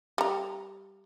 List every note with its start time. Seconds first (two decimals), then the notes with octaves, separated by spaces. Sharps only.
0.18 G3 A#5